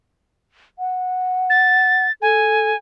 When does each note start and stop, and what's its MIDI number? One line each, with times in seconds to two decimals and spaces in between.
0.79 2.06 78
1.50 2.12 93
2.22 2.73 69
2.22 2.77 80